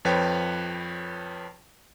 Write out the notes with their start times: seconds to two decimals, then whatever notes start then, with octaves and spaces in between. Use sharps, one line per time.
0.05 F2 F3 B4 C#5 G5